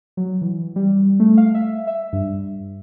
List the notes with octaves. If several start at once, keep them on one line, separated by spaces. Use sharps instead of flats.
F#3
E3
G3
A3
F5
E5
E5
G2